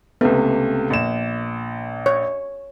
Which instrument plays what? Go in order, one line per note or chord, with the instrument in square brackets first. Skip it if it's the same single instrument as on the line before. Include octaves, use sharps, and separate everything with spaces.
[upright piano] C#2 C3 A3 [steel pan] B3
[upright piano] A#1 E7
[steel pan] C#5